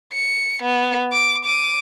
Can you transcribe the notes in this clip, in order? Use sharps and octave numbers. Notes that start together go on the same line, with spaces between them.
C#7
B3
D6
D6 D#7